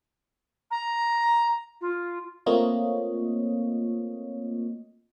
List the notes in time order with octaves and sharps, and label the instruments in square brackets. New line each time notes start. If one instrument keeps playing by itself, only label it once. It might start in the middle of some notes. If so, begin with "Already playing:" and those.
[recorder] A#5
F4
[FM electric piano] A3 A#3 C4 F4 C#5 D#5